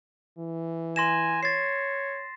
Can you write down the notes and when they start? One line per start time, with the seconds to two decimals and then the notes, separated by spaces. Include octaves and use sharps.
0.38 E3
0.96 G#5 C6 A#6 E7
1.43 C#5 A6 C7